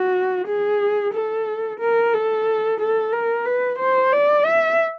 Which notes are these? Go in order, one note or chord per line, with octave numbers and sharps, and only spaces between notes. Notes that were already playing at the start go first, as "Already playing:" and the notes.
Already playing: F#4
G#4
A4
A#4
A4
A4
A#4
B4
C5
D5
E5